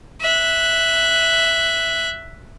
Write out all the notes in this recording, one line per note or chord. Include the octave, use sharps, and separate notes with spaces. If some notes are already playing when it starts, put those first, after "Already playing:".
E5 F#6